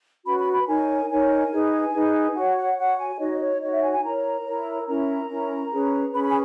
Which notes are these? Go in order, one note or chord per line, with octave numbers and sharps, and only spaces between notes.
C#4 F#4 B4 B5
B5
B5
D#4 A#4 C#5 G#5
D#4 A#4 C#5 G#5
D#4 G#4 B4
D#4 G#4 B4
F#4 C#5 F#5
F#5
F#4 C#5 F#5
G#5
D#4 F#4 C#5 D#5
C#5
D#4 F#4 C#5 D#5
E5
G#5
G#5
E4 A#4 C#5 A#5
E4 A#4 C#5
C#4 E4 A#4 A#5
C#4 E4 A#4
C#4 G#4 B4
C#4 G#4 B4 B5
B5
G#5